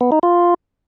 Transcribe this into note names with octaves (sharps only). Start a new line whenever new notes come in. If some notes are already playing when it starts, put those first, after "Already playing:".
B3
D#4
F4